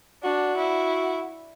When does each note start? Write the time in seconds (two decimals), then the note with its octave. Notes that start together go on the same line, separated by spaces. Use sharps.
0.24 D4 F#4
0.57 E4